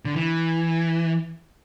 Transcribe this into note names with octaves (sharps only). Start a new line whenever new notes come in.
D3
E3